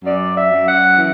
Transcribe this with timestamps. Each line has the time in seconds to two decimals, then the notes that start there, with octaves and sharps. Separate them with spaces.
0.03 F#2 D5
0.35 E5
0.51 F#2
0.67 F#5
0.97 E3